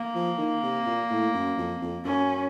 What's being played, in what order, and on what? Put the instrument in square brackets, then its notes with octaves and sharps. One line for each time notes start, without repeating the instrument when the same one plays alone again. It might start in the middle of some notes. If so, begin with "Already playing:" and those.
Already playing: [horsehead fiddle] A#3
[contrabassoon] F3
D#3
C3
A#2
A2
F#2
F2
F2
[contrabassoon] F#2 [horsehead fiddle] C#4